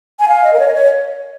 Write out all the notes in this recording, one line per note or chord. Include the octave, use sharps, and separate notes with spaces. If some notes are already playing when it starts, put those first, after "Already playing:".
G#5
F5
D#5
A#4
C#5
D#5
C#5